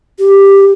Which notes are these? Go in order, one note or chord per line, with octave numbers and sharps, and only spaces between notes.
G4